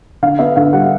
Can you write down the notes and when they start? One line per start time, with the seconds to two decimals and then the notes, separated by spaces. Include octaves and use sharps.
0.22 D3 F5
0.39 B3 E5
0.56 D3 F5
0.73 G3 F#5